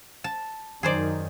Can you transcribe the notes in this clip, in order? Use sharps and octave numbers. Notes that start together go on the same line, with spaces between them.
A5
F#2 D#3 G#4 C5 D5